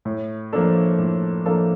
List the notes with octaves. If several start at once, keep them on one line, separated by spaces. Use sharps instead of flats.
A2
F3 A#3 D4 A4
A2
F3 A#3 D4 A4